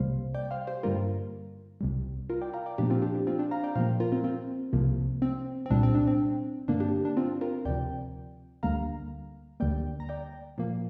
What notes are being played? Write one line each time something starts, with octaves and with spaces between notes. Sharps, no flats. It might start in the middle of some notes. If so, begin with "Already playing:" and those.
Already playing: C2 C3 G3 A#3 C5 F5
D5 G5
C5 F5
G4 C5
G2 D3 G3 A#3 F4 A#4
C2 C3 G3
F4 A#4
D5 G5
F5 A#5
D5 G5
A#2 F3 A#3 D4 G4
C4 F4
D4 G4
D4 G4
C4 F4
D4 G4
F5 A#5
D5 G5
A#2 F3 A#3 C5 F5
F4 A#4
C4 F4
C4 F4
C2 C3 F3 A#3
C4
C4
C2 A#2 G3 D4
C4
D4
C4
G2 D3 A#3 D4
D4 G4
D4
C4 F4
F4 A#4
D2 C3 F3 D5 G5
D2 D3 G3 A#3 F5 A#5
D2 D3 G3 A#3 D5 G5
A#5
D5 G5
A#2 F3 A#3